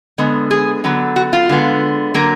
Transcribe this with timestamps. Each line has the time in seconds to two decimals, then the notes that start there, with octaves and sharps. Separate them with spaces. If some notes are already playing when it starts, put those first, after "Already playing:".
0.18 D3 G#3 B3
0.51 G#4
0.84 D3 F#3 B3
1.16 F#4
1.33 F4
1.49 D3 G#3 B3
2.14 D3 F#3 A#3 A#4